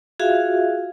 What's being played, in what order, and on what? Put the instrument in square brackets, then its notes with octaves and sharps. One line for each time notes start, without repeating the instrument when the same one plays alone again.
[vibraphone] F4 F#4 G#4 E5 F5